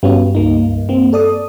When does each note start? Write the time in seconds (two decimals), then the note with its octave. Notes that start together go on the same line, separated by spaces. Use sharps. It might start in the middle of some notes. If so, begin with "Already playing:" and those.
0.03 G2 B3 C#4 F#4
0.35 C#2 A#3 D#4
0.89 A#3 C4
1.13 A4 D5 D#6